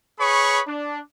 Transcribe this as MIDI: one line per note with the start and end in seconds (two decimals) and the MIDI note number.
0.19 0.60 68
0.19 0.60 71
0.19 0.60 73
0.19 0.60 83
0.19 0.60 85
0.67 0.99 62